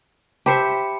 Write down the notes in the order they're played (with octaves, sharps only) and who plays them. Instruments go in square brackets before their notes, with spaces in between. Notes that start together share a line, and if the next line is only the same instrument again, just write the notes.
[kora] G4 C5 E5 [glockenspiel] A5 B5 C#7